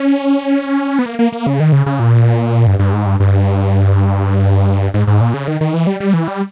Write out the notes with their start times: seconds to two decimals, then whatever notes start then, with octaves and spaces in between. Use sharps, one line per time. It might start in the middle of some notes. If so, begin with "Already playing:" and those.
Already playing: C#4
0.99 B3
1.06 A#3
1.19 A#3
1.32 A#3
1.47 C#3
1.60 D#3
1.72 C#3
1.86 C#3
2.00 A#2
2.67 G2
2.79 G2
2.93 G#2
3.06 G2
3.20 G2
4.94 G#2
5.07 G#2
5.21 A#2
5.34 C#3
5.48 D#3
5.61 D#3
5.74 E3
5.87 G3
6.00 G3
6.14 E3
6.28 G3